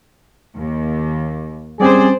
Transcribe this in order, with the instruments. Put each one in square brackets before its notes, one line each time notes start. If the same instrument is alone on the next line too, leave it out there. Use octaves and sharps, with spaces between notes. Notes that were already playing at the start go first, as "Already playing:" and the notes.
[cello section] D#2
[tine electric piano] G3 C4 C#4 [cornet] G#4 [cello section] C5 D5